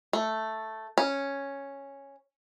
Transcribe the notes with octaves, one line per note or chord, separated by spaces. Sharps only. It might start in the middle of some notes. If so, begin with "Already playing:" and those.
A3
C#4